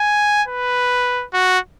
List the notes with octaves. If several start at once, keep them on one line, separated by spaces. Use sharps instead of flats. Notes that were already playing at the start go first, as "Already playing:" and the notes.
Already playing: G#5
B4
F#4